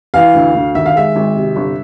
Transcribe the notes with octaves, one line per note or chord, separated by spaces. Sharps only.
E3 F5
D2
D2
D#3 E5
F5
G#3 E5
G#1
C3
G1